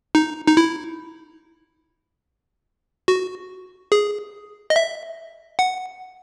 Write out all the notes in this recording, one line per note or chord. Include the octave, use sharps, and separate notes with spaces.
D#4
D#4
E4
F#4
G#4
D#5
E5
F#5